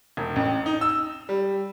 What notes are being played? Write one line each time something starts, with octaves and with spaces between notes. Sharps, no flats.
E1
A1
D#4
E6
G3